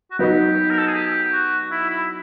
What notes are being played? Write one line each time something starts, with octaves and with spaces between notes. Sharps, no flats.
F#4
F#3 B3 D#4 G4
A#4
A4
G#4
G4
F#4
E4
E4